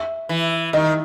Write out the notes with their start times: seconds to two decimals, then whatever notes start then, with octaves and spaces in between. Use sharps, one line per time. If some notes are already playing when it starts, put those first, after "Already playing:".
Already playing: E5
0.29 E3
0.73 D#3 D#5